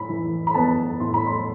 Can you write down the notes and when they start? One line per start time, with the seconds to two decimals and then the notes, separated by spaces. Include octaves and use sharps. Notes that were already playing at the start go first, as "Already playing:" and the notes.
Already playing: A2 B5
0.09 E3
0.47 B5
0.54 B3 A5
1.00 A2 C6
1.14 B5
1.27 C6